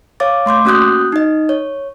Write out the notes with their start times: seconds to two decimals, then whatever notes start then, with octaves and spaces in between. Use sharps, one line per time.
0.20 C#5 F5 D6 A6
0.46 A3 C6 D6 G6
0.65 A#3 C#4 F#4 D#6 F#6 G6
1.12 D#4 D#5
1.49 C#5